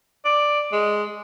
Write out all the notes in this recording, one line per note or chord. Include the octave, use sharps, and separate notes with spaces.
D5
G#3